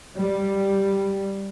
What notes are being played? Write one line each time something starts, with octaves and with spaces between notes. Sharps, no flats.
G3